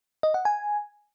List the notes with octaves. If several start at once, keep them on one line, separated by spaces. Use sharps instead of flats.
D#5
F#5
G#5